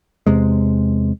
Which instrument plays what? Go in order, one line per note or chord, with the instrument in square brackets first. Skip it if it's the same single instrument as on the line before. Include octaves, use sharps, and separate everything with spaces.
[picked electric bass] E2 C3 G#3